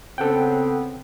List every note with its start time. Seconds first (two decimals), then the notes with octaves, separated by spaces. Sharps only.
0.18 C#3 B3 C4 A4 F#5 G5